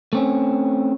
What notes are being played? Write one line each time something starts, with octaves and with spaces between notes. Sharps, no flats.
A3 C4 C#4